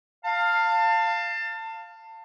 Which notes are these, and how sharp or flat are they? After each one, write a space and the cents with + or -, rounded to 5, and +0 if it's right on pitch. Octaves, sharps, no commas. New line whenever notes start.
F5 +0 A5 +30